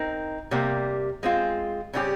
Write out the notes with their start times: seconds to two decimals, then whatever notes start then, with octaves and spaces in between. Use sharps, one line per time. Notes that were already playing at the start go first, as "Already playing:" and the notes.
Already playing: C4 D#4 A#4
0.51 C3 G3 A#3
1.23 G#3 C4 F4
1.93 C#3 G3 C4 D#4 G4